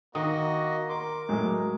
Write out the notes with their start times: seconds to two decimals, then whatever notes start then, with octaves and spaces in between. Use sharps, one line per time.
0.15 D#3 A#3 F#4 D#5 D#6
0.89 A#4 C6 D6
1.29 A2 F#3 G#3